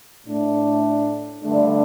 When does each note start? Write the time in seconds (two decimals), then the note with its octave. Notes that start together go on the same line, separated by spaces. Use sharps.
0.25 A2 A3 D4
1.42 G2 D3 A3 D4